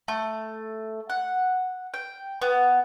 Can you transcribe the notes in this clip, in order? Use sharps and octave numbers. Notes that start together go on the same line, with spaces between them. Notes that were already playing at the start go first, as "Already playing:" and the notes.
A3
F#5
G5
B3